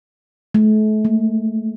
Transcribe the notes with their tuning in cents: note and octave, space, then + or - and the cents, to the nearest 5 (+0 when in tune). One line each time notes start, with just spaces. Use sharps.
A3 -35
A3 +40